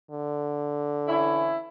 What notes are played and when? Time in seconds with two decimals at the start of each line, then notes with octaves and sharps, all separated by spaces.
0.11 D3
1.08 E3 C#4 E4